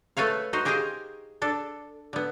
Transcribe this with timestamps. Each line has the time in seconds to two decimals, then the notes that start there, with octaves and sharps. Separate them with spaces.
0.17 A3 A4 B4 C#5 F5
0.53 D#4 F#4 C5
0.65 G4 G#4 A#4 C5 D#5 F5
1.42 D4 A4
2.13 D3 B3